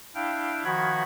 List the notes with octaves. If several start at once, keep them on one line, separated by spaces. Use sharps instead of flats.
D4 E4 F5 G5
D#3 F3 F#4 F#5 B5 G#6